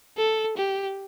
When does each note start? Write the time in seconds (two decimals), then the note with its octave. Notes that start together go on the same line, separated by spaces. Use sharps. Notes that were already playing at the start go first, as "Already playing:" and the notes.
0.17 A4
0.57 G4